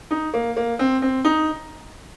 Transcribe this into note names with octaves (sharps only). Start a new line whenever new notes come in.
D#4
A#3
A#3
C4
C4
D#4